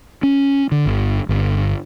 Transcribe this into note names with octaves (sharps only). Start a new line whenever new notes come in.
C#4
D3
G1
G1